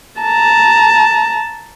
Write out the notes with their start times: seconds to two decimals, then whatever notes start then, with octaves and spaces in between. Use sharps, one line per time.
0.21 A5 A#5